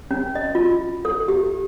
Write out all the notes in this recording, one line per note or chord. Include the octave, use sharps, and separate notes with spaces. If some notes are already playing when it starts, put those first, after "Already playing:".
C#4
D#5
F4
A4
G4